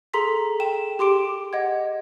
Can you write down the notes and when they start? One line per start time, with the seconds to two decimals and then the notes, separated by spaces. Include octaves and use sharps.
0.14 G#4 A4 A#5 C6 B6
0.60 G5 E7
0.99 G4 C6 D6 D7
1.53 D#5 F#5 G#6